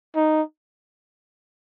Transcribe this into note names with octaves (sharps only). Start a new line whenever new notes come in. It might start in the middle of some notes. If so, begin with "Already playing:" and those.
D#4